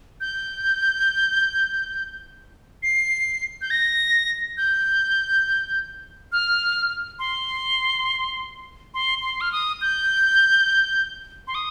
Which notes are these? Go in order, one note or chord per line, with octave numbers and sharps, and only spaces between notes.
G6
C7
G6
A#6
G6
F6
C6
C6
C6
F6
D#6
G6
C6
D#6